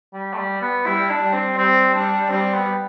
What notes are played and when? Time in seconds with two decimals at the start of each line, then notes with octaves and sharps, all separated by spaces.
0.14 G3
0.33 A3
0.38 G3
0.61 B3
0.86 G3 E4
1.10 D4
1.22 G3
1.33 C4
1.57 G3 C4
1.94 G3 D4
2.30 G3 C4
2.54 B3